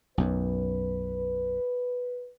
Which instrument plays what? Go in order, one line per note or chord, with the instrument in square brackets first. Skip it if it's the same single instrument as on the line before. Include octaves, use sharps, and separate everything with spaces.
[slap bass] B1 F#2 [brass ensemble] B4